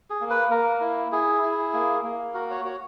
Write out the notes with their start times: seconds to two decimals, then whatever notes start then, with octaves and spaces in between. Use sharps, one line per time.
0.10 G#4
0.21 A#3
0.30 B4
0.51 A#3 A#4
0.81 E4
1.12 E4 G#4
1.42 E4
1.73 A#3
2.04 A#3
2.34 F#4 A#4
2.50 C#5
2.65 F#4 C#5